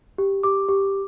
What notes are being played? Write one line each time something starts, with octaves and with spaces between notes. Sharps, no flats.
G4
G4 D6
G4